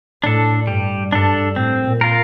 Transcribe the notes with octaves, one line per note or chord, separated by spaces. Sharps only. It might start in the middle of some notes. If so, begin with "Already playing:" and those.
A2 D4 A4
G2 G3
G2 D4 A4
A2 C4
A#2
F4 A#4